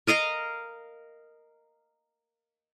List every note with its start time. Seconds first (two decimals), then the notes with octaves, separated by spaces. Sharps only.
0.07 A#4 D#5 F5 A#5